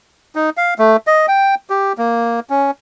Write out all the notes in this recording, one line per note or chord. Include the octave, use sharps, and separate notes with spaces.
D#4
F5
A3
D#5
G5
G4
A#3
C#4